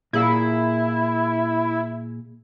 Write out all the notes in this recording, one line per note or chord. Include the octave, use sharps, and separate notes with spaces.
A#2 E4 G#4 F5